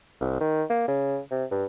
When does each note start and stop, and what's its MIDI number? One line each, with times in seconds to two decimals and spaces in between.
0.21 0.39 36
0.41 0.63 51
0.70 0.84 58
0.88 1.19 49
1.31 1.44 48
1.51 1.65 43